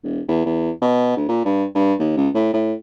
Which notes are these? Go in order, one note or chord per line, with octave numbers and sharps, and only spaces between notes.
E1
E2
E2
B2
D2
A#2
G2
G2
D#2
C#2
A2
A2